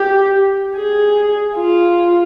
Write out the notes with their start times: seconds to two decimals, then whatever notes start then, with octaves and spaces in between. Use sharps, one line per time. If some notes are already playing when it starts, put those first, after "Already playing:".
Already playing: G4
0.76 G#4
1.57 F4